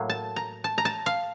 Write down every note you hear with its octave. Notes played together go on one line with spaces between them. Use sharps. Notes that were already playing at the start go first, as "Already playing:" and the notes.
Already playing: A2 F#3 A#3
A5
A#5
A5
A#5
A5
F5